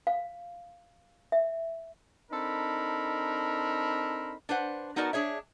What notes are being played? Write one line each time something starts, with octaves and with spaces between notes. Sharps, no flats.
F5
E5
C4 D4 D#4 A4 A#4 B5
D4 B4 C5 F#5
B3 D#4 F#4 A#4 D5 A5
D4 G#4 C#5 E5